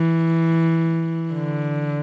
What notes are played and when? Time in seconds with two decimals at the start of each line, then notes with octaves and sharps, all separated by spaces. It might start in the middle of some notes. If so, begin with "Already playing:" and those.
Already playing: E3
1.34 D3